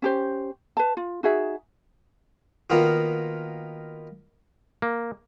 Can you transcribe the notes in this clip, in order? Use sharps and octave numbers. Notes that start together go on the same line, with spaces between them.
C#4 G4 C5
B4 A5
F4
D#4 F#4 G#4 E5
D#3 A#3 B3 F4 F#4
A#3